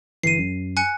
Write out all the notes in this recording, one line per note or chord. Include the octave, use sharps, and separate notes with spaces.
G1 E3 C7 D#7
F#2
G#5 F#6 C#7